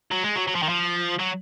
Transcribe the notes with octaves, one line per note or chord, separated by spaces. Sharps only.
F#3
G#3
F#3
F#3
F3
D#3
F3
F#3